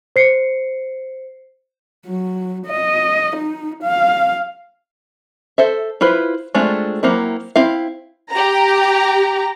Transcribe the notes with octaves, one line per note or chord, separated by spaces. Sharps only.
C5 C7 C#7
F#3
D#5
D#4
F5
A4 C5 E5
E4 F4 B4 C5
G#3 A3 C4 D4 F4
F#3 A#3 C4 E4
C4 E4 F5
G4 A#5